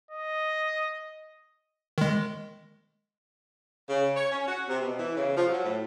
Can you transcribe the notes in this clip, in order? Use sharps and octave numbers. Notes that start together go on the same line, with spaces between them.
D#5
D#3 G#3
C#3
C#5
C#4
F#4
C3
B2
E3
C#3
F3
F#3
A2